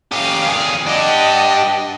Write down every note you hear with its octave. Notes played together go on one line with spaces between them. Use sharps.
C#4 G4 F5
F2 G#4
D4 G4 D#5 F#5 A5